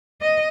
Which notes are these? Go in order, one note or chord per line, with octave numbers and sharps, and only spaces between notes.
D#5